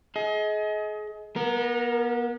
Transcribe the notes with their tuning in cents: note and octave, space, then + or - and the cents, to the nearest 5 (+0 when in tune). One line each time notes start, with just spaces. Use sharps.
G#4 +35 D#5 +30
B3 -35 A#4 +0